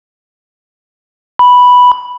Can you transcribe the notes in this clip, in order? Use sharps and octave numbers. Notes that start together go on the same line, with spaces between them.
B5